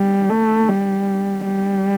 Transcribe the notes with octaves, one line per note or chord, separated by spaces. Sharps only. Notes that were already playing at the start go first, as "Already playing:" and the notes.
Already playing: G3
A3
G3
G3